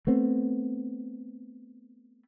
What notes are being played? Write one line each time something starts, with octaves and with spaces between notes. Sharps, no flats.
A3 B3 C4